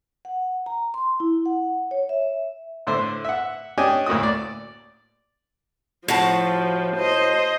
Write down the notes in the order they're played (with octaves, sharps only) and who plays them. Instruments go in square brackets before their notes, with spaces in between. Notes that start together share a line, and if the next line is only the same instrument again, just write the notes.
[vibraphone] F#5
A#5
C6
E4
F#5
C#5
E5
[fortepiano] A2 D3 C5 E5
E5 F#5
C#4 D4 G4 D#5 G5 G#5
D2 A2 A#3 F#4 D#6
D5
[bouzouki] A2 F#4 A5 [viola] F3
[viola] C5 D#5